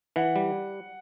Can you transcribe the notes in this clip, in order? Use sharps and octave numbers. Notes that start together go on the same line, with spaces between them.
E3 F#5
G3